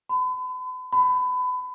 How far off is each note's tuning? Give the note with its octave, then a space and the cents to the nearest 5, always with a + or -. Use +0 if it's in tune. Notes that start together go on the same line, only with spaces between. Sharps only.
B5 +40
B5 +25